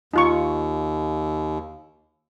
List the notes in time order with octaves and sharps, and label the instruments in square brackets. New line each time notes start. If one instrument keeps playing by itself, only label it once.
[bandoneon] D#2 [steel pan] D#4 F4 C#6